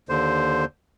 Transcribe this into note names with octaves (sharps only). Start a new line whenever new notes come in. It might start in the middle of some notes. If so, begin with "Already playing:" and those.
D#2 D3 C5